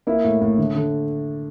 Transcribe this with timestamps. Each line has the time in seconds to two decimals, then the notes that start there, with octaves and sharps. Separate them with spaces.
0.07 A#3 E4
0.24 A2
0.41 A2
0.58 D3
0.75 D3